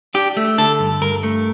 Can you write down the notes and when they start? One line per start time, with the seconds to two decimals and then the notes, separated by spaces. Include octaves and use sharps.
0.14 D4 G4
0.37 A3
0.58 D3 A4
0.80 G2
1.01 G2 A#4
1.23 A3